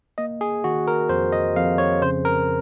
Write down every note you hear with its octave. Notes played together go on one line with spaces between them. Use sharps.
A#3 D#5
G#4
D#3 F#4
A#4
F2 C5
D#5
F2 F5
C#5
C#3 C5
A#4